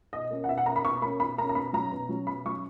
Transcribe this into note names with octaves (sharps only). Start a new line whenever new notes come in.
B2 D#5
A#3 C#4
F#5
B2 E5
F#5
A#3 C#4 A#5
B5
B2 C#6
A#3 C#4 B5
B2 B5
A#3 C#4 A#5
A#5
B2 B5
F#3 C#4 A#5
B2
F#3 C#4
B2 B5
F#3 C#4 C#6